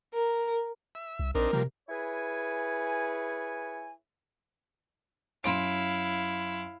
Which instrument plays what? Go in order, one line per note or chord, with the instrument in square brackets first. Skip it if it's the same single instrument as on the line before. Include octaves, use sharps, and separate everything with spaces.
[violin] A#4
[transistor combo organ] E5
[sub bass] C2
[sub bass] A#1 [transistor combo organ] C4 D4 D#4 [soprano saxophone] A#4
[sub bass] C3 [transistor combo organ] F3 G3 A#3
[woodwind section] E4 G#4 B4 C#5 G#5
[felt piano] F#2 C6 D7 [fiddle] E4 F5